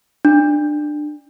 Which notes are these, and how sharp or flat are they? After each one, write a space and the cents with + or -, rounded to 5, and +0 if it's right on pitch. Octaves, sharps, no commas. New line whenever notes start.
D4 +20